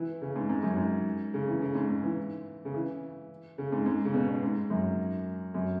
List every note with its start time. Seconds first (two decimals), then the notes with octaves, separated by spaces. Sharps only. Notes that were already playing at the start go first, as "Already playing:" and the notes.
Already playing: E3
0.22 C#3
0.36 G#2
0.49 G#2
0.63 F#2
0.77 G#2
1.34 C#3
1.48 E3
1.62 C#3
1.75 G#2
1.90 G#2
2.03 E3
2.65 C#3
2.74 E3
3.58 C#3
3.72 G#2
3.86 G#2
4.05 C#3
4.14 B2
4.28 B2
4.43 G#2
4.70 F#2
5.54 F#2